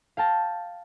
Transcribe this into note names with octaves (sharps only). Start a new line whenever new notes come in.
F5 G5 A5 A#6